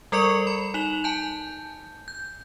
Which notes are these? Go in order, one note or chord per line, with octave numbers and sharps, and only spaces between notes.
G3 A4 A#4 D5 C#6 C#7
B5
D#4 F7 F#7
G#5 A5 G6
G6